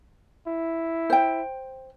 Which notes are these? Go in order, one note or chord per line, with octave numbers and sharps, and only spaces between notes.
E4
C5 G5